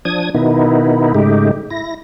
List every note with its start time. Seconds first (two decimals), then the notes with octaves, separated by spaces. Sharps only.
0.05 F3 D4 D#6 G#6
0.35 B2 D#3 B3 D#4 E4
1.15 G#2 C#3 G#3 A3 D#4 G4
1.70 E4 A#6